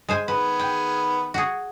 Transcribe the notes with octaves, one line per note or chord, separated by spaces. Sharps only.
G#3 C5 G#5
D#3 B3 G#4 B4
G5
F#4 G#4